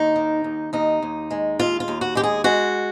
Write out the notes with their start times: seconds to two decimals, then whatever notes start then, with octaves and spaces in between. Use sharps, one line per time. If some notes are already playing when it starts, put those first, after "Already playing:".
Already playing: D#2 D#4
0.16 D#3
0.44 D#2
0.73 D#2 D#4
1.02 D#2
1.31 G#3
1.59 D#2 F4
1.80 F4
1.88 D#2
2.01 F#4
2.15 G#3 G4
2.23 G#4
2.44 G#3 F#4